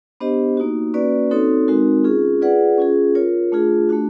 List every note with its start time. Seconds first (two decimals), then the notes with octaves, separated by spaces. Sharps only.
0.20 B3 D4 G4 C5 D#5
0.57 A#3 D#4 F#4
0.94 A#3 C#4 F#4 B4 D5
1.31 C4 D#4 F#4 A4 C#5
1.68 G#3 C4 D#4 F#4 A#4
2.04 C#4 F4 G#4
2.41 F4 G#4 B4 D5 F#5
2.78 C#4 F4 G#4
3.15 F4 A#4 C#5
3.52 A3 D4 F4 G#4
3.89 A3 D4 F#4